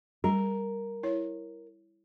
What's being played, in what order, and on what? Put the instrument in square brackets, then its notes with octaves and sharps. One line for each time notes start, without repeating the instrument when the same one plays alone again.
[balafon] G3 [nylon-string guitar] A#4
[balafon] E4 C#5